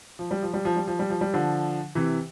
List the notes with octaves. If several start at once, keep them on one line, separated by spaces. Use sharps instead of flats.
F3
G3
F3
G3
F3
G3
F3
G3
F3
G3
D3 F3
C3 E3